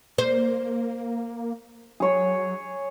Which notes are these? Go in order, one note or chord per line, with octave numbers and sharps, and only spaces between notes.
A#3 C5
F#3 G#4 C#5